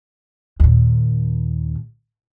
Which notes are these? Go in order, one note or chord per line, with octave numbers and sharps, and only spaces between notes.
D#2 A#2